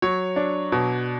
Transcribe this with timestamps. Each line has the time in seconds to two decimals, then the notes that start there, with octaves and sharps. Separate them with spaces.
0.02 F#3 C#5
0.36 D4
0.72 B2